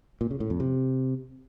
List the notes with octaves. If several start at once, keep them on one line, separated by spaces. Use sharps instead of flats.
A#2
C#3
A2
F2
C3